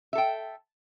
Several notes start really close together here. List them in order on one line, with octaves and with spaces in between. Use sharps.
E5 A4 G5